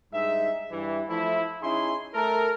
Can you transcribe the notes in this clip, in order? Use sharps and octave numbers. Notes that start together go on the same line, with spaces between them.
G2 G#3 D#4 E5
G2 E3
F3 A3 E4
C#4 D#4 E4 G#4 C6
A3 A4 A#4